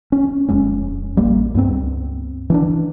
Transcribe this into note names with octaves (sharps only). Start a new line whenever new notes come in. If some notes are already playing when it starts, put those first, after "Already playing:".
C#4
D#1 F2 G#3 C#4
A1 G3 A#3
C#2 G2 B3 C4
E3 C#4 D4